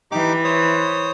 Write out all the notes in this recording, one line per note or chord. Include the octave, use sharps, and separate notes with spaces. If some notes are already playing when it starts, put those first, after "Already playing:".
E3 D#4 G4 D6
C5 C#5 D#6